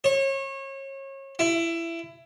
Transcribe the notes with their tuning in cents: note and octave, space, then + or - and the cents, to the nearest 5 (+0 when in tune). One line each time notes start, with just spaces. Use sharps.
C#5 -30
E4 +20